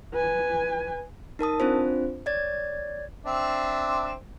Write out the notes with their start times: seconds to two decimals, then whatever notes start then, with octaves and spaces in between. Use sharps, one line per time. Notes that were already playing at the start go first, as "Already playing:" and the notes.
0.13 B4 G#5
1.39 D#4 A#4 A5 D#6
1.60 C4 D4 F4 C5
2.26 C#5 D5 G#6 A6
3.26 C4 D4 E5